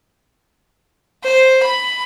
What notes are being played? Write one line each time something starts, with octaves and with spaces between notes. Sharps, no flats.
C5
B5